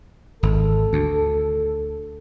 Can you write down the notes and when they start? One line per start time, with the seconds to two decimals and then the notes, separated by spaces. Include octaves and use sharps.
0.43 G#1 A4
0.93 D2